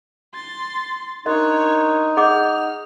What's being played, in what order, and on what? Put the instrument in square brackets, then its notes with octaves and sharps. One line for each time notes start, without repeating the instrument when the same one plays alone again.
[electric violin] C6 A6
[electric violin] D4 C#5 [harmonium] D#4 [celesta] A#4 C6 F#6 [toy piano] D#5
[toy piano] G#4 D#5 D6 [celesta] F#5 G6 [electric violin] F6